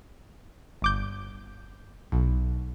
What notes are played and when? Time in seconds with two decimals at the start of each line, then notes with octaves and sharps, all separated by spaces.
0.82 G1 D6 G6
2.12 B1